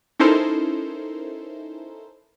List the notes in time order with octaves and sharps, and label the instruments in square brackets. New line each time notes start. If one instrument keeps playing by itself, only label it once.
[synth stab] C#4 D#4 E4 A4 A#4 C5